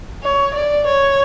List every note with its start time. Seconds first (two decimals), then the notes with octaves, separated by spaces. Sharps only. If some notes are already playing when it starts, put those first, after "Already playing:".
0.23 C#5
0.54 D5
0.87 C#5